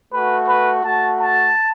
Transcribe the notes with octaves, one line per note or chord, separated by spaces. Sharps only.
A3 F#4 B4
B4
A3 F#4 A5
A5